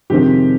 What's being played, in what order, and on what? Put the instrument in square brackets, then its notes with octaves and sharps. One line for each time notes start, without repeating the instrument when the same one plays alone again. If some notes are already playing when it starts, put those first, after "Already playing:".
[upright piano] F2 C3 D#3 G#3 C4 G4